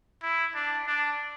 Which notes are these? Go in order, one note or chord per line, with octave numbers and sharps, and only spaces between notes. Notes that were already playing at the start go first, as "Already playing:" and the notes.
E4
D4
D4